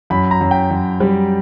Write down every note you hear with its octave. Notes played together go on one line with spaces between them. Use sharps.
F#2 B5
A#5
F#2
G5
F#2
G3